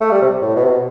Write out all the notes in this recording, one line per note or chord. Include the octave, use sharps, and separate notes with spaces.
A3
G3
C3
A2
B2
C3
B2